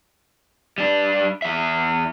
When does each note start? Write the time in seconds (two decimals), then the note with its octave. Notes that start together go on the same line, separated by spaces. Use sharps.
0.78 G3 D4
1.42 E2 E5